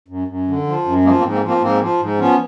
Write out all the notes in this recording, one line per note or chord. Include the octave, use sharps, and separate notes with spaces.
F#2
F#2
D3
F3
F#2
F3 G#3 A#3
A#3 C4
G#2
A#3 C4
F3 A#3 C4
G#2 A#3 C4
F3
G#2
F3 B3 C#4